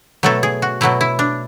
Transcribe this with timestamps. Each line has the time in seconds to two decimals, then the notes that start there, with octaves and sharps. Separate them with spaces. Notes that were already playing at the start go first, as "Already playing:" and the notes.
0.23 B2 F#3 A3 A4
0.43 G#4
0.62 F#4
0.81 B2 F#3 A3 E4
1.01 E4
1.19 D4